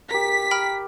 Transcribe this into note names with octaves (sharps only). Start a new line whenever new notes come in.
G4 A#4 B6
G5 B5 F6